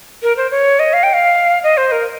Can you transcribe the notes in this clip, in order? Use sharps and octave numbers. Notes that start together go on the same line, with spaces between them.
A#4
C5
C#5
D#5
F5
G5
F5
D#5
C5
A#4